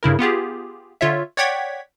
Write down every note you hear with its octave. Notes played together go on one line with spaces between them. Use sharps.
G2 C#3 E4 A#4
B3 F4 G4 G#4
D3 F4 C#5 E5
C#5 D5 F#5 G5 G#6 B6